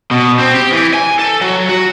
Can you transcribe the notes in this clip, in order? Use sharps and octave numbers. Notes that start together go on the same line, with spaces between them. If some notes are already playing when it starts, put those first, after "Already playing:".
B2
C4
G4
E3
G#5
A4
F#3
F#4